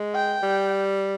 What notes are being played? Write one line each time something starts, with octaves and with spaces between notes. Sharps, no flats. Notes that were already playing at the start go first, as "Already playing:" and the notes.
Already playing: G#3
G5
G3